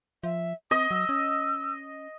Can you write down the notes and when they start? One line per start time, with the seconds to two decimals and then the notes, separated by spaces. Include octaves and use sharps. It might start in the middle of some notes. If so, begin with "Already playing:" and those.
0.23 F3 E5
0.71 C4 D#5 D#6
0.91 F#3 E6
1.09 C#4